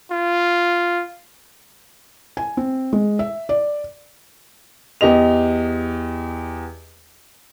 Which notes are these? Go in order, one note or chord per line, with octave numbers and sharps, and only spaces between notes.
F4
G#5
C4
G#3
E5
D5
E2 G4 D#5 F7